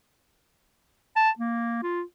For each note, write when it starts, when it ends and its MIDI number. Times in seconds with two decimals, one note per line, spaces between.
1.16 1.30 81
1.39 1.81 58
1.83 2.02 65